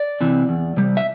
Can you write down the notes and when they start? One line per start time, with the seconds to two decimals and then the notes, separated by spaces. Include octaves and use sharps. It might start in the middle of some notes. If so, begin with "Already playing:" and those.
Already playing: D5
0.21 C3 E3
0.49 E2
0.77 C3 G3
0.97 E5